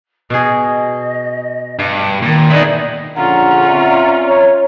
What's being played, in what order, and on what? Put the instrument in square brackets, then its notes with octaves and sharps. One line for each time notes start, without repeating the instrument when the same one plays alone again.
[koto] B2 G#4 [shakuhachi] D#5
[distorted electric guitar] G2
[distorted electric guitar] A#2 [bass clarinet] D#3
[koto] B3 D#4 [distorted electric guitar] E4 G#4 [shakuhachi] D5
[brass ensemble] A#1 D3 [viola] C#4 F4 [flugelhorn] F#5 [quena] A#5
[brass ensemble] C4 D5 E5
[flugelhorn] C#5